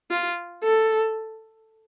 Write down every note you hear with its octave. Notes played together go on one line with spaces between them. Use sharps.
F4
A4